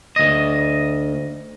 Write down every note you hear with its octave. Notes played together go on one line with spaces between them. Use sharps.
D2 D#5